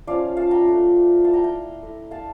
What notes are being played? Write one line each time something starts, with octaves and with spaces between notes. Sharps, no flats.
F3 C#4 F4 D5 F5
F5 A5
G5 A#5
A3 D4 F4
A#3 E4 F5 A5
G5 A#5
G5 A#5
A3 E4
F5 A5